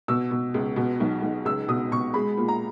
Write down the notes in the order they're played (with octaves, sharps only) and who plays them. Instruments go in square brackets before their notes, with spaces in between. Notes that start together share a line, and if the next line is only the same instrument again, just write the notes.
[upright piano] B2 E6
B2
C#2
B2
B1
B1
C#2 E6
B2 D#6
B2 C#6
G#3 B5
A#2
A#5